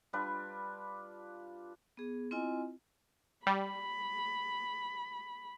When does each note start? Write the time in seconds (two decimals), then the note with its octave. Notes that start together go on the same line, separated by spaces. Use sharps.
0.13 G3 D4 F4 B4
1.97 B3 G#4
2.31 C4 E4 F4 D#5 G#5
3.47 G3 B5